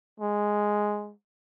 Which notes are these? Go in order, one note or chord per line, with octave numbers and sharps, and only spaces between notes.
G#3